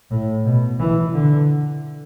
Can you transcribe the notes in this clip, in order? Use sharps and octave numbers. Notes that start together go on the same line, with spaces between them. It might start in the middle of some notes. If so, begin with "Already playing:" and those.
A2
B2
E3
D3